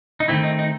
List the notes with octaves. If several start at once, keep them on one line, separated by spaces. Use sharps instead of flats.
D#4
D#3 A3 C4 E4
D#4
D#4